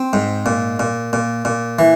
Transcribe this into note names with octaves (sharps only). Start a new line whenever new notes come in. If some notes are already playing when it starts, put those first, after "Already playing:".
Already playing: C4
G#2
A#2
A#2
A#2
A#2
E3